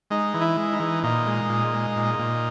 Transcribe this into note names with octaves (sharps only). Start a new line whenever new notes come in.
G#3 D#4
E3
E4
G#3
D#4
E3
A#2 D#4
G#3
A#2
G#3
A#2
A#2